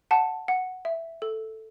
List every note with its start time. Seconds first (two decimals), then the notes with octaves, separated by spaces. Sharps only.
0.11 F#5 A5
0.48 F#5
0.85 E5
1.22 A4